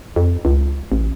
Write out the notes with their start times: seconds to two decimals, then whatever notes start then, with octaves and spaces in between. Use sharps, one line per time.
0.16 F2
0.45 C#2
0.92 A1